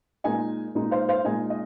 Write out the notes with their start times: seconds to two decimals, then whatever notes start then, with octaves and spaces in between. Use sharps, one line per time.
0.24 A#2 G#3 D#4 D#5 G#5
0.75 A#2 G#3 D#4
0.91 C5 F5
1.09 C5 F5
1.24 A#2 G#3 D#4 D#5 G#5
1.50 D#5